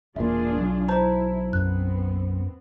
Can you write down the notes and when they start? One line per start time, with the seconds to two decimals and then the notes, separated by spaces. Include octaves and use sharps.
0.16 E1 A#2 D4 F4 G#4 E5
0.58 B1
0.88 E4 C5 A5 A#5
1.53 F#2 B3 C4 F#6